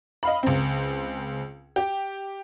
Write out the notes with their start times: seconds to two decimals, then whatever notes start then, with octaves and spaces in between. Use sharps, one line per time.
0.23 D#5 F5 B5
0.43 C#2 C4
1.76 G4